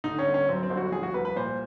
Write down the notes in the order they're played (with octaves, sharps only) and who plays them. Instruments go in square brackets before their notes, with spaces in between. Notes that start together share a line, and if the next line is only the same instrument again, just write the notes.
[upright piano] D3 [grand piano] D#4
[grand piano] C#4
[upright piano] G1
[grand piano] C#4
[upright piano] F#2 [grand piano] C4
[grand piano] C4
[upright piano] G1
[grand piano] F#4
[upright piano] F3 [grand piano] G#4
[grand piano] F#4
[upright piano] C2 [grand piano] B4
[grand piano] B4
[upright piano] A#2 [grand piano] C5